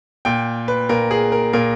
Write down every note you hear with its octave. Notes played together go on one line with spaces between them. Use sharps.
A#2 G5
B4
A#2 A#4
G#4
A#4
A#2 A#4